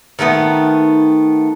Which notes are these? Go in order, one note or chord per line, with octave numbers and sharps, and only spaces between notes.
D#3 G3 A3 B3